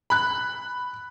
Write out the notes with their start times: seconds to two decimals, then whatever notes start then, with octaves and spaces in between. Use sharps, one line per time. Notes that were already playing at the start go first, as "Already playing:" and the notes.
0.10 B5 F#6